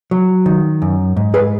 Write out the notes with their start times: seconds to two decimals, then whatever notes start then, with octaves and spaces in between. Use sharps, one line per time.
0.11 F#3
0.46 D#3
0.82 F#2
1.17 G#2
1.34 G#4 B4